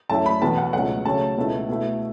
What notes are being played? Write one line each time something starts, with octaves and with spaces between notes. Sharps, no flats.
F#2 F#3 A3 E4 A5
B5
E2 B2 B3 A5
F#5
C#2 B2 F#3 A3 F#5
C#3 F#3 A3 C#4 A5
C#2 B2 A3 E4
B2 A3 E4